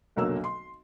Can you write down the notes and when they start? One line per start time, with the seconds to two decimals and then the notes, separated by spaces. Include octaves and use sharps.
0.16 F1 B1 D3 F#3 A#3 E6
0.44 C6